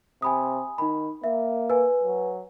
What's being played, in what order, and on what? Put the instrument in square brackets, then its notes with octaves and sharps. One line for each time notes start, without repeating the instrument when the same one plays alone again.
[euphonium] C3 [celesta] G#5 B5 D#6
[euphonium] D#3 [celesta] D#4 B5
[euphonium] A#3 [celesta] E5
[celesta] B4 G#5
[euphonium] F#3